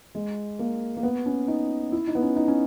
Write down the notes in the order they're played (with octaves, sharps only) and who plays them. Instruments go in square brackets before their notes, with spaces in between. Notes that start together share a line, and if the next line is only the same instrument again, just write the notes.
[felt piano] G#3
A#3
A#3
B3
C#4
D#4
E4
D#4
B3
C#4
D#4
C#4